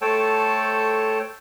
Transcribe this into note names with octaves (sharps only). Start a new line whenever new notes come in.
A3 A4 C5 C#5 G5 A5